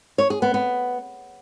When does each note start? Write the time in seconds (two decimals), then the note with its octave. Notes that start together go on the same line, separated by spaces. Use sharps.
0.18 C#5
0.30 G#4
0.42 B3
0.54 B3